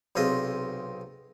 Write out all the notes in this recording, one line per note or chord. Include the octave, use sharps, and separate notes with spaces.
B1 C3 C4 F4 G#4 D#5